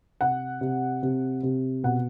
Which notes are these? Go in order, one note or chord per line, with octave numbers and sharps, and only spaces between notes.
C3 F#5
C3
C3
C3
B2 F#5